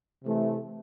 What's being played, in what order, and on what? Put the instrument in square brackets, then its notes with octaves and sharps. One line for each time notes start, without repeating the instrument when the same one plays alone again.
[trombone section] C3 E3 A3